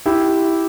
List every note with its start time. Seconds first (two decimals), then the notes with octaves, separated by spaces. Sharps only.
0.06 E4 G4